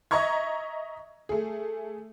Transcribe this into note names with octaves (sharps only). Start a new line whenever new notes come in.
D#5 E5 A#5 C#6 G#6
A3 G#4